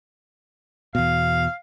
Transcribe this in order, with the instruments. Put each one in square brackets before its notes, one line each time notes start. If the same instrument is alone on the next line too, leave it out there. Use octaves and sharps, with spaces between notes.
[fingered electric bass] E2 B2 [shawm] F5